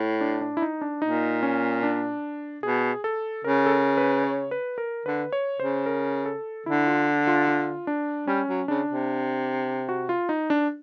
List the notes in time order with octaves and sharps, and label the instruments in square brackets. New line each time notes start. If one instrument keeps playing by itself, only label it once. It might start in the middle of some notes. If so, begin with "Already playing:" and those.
Already playing: [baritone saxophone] A2
[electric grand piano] D4
D4
E4
D#4
D4
[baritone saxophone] A#2 [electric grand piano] D#4
[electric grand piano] C#4
D4
[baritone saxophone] B2 [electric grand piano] G#4
[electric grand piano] A4
[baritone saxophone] C#3 [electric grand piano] A#4
[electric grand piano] A4
A#4
B4
C#5
B4
A#4
[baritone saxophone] D3 [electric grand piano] B4
[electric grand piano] C#5
[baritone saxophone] C#3 [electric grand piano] C5
[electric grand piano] A#4
A4
[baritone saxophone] D3 [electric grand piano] E4
[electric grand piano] F4
F4
F4
D4
[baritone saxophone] G3 [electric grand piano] C#4
[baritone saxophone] F#3
[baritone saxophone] C#3 [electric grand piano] D4
[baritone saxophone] C3
[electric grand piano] F#4
F4
D#4
D4